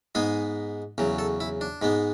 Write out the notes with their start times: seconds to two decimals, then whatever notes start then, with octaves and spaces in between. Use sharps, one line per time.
0.15 G#2 G#3 B3 G#4
0.98 E2 C#3 F#3
1.19 A4
1.40 E4
1.61 D4
1.82 G#2 G#3 B3